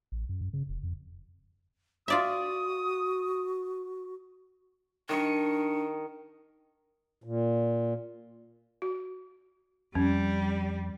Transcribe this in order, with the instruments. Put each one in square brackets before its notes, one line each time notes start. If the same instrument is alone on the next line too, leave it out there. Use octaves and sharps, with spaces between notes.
[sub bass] A1
F#2
F#2
C#3
E1
F2
[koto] F4 D5 E5 [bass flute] F#4 [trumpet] D#6
[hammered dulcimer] D#3 D#5 C#6 [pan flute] D4
[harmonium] A#2
[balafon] F#4
[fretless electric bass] F2 [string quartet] G3 [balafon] C#4